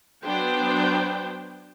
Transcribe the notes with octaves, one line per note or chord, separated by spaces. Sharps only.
F#3 B3 D4 C5 G5